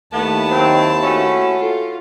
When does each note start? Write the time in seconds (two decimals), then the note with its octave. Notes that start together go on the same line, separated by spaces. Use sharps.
0.13 D#2 A3 B3 E4 A5
0.51 D#3 F#3 C4
1.03 A3 C#4 F#4
1.60 F4 A4